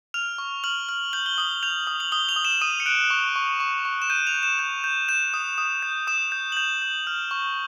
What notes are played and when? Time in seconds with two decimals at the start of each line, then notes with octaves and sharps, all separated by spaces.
0.14 F6 F7
0.38 C#6
0.64 F6 F#7
0.89 F6
1.13 G6 F#7
1.26 G7
1.38 D#6 F#7
1.63 G6 F7
1.87 D#6
2.00 F#7
2.12 D#6 G7
2.29 F7
2.36 D#6
2.45 E7
2.61 D#6 D#7
2.80 C#7
2.86 F#6 D7
3.10 C#6
3.36 C#6
3.60 C#6
3.85 C#6
4.02 E7
4.10 G6 D#7
4.27 F7
4.34 G6
4.43 E7
4.59 G6
4.84 G6
5.09 G6 E7
5.34 D#6
5.58 D#6
5.83 G6
6.07 D#6 E7
6.32 G6
6.52 F#7
6.57 G6 F7
6.82 G6
7.07 F6
7.31 C#6